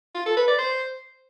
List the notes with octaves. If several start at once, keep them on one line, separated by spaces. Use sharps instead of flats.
F4
A4
B4
D5
C5